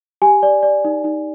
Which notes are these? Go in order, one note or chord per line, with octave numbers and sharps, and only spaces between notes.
G4 G#5
D5
D5
D#4
D#4